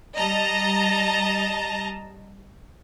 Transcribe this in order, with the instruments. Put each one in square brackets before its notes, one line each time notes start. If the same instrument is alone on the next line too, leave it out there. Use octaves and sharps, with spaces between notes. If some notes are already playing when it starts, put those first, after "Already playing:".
[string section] G3 D#5 A5 A#5